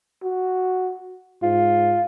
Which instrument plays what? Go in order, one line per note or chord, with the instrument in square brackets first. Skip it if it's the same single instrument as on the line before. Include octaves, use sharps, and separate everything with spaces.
[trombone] F#4
[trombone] G#2 [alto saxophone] F4